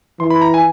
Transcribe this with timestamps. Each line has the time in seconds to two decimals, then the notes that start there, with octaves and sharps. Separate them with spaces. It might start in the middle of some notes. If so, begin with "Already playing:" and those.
0.19 E3 C6
0.30 B5
0.42 A#5
0.54 G#5